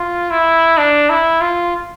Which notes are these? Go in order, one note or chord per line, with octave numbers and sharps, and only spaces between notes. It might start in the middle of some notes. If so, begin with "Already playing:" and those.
Already playing: F4
E4
D4
E4
F4